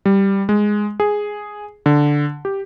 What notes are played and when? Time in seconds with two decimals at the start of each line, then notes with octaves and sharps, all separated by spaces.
0.06 G3
0.49 G#3
1.00 G#4
1.86 D3
2.45 G4